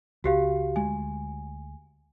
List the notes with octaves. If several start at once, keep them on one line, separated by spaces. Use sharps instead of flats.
C#2 F#4 G4 F5
D2 G#3 G#5